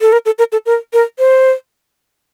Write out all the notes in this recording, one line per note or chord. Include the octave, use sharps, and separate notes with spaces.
A4
A#4
A4
A#4
A4
A#4
A#4
C5